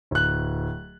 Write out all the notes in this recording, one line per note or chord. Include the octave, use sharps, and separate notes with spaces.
D1 F#6